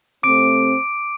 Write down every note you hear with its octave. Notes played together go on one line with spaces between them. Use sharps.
C3 A3 C4 D6 D7